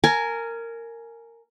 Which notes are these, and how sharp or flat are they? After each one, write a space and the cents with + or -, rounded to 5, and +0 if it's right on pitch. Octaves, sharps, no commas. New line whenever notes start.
A#4 -15 G#5 +15